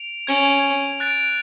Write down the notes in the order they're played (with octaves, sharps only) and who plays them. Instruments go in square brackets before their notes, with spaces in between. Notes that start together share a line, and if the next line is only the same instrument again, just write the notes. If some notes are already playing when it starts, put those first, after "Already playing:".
Already playing: [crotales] D7 F7
[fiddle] C#4 [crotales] G#6 D7 F7
[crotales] F#6 A6 D7